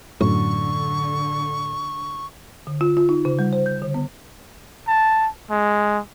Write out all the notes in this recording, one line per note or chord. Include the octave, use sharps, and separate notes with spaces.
F#2 A2 D3 C#6
D3
F4
F4
D#4
C#3
G3
C5
G6
D3
B3
A5
G#3